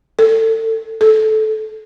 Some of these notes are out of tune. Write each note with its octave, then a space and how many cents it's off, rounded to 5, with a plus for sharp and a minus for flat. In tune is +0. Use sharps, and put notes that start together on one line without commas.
A4 +30
A4 -15